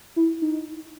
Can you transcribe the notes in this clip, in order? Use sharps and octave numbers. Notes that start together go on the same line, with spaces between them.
E4
D#4